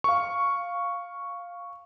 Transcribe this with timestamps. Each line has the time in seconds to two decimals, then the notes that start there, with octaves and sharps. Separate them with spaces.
0.04 F5 C#6